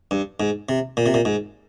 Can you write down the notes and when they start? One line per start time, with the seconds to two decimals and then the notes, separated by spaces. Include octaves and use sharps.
0.11 G2
0.40 G#2
0.69 C3
0.97 A#2
1.06 C3
1.14 A#2
1.25 G#2